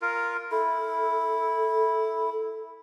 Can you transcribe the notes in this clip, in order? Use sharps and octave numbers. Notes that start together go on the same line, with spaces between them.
F4 A#4
E4 A4